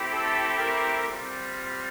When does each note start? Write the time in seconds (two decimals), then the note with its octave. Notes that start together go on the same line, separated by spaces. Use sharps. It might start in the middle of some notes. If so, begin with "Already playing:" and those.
Already playing: A3 C4 E4 G4
0.12 A4
0.59 A#4
1.05 G3 C4 F4